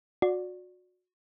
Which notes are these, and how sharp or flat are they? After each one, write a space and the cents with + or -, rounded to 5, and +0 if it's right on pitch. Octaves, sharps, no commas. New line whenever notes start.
F#4 -30 D5 +0